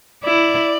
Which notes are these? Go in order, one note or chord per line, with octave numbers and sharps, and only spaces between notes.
E4 D5